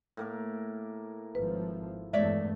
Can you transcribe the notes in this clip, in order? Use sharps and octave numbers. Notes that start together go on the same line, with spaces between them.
A2 A#3 A#4
G#1 F3 B4
E2 G2 G#3 A3 C#5 D5 E5